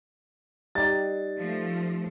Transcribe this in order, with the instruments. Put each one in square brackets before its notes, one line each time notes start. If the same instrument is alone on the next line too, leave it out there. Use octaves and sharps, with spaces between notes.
[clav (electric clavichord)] G3 D#4 G4 [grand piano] A6
[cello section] F3 A3